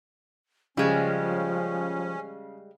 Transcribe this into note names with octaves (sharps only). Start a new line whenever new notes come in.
C#3 F3 G3 G#3 C#4